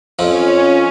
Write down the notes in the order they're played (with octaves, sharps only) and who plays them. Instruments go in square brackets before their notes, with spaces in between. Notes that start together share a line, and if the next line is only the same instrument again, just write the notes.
[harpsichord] F2 F3 [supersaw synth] C#4